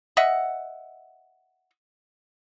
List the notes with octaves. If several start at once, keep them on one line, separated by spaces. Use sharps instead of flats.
D#5 E5 F#5